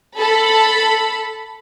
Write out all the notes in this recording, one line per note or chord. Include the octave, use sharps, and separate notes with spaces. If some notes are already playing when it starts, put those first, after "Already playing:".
A4 B5